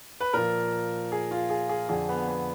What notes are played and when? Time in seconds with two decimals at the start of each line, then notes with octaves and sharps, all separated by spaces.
0.20 B4
0.33 A#2 F3 A#4
1.12 G#4
1.31 F4
1.50 G#4
1.69 G#4
1.89 F2 D3 F3 G#4
2.09 B3
2.28 B3